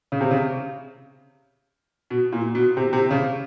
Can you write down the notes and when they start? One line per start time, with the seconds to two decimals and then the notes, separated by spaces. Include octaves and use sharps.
0.12 C#3
0.21 C3
0.31 C#3
2.10 B2
2.32 A#2
2.55 B2
2.77 C3
2.93 C3
3.11 C#3